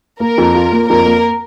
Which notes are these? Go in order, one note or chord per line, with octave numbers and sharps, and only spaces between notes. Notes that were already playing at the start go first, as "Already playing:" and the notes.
A#3 A#4
F2
F4
A#3
F2 A#4
A#3